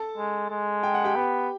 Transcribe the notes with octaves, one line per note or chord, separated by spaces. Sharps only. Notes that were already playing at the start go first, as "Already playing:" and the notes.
Already playing: A4 A5
G#3
G#3
G5
F#5
G4 G5
B3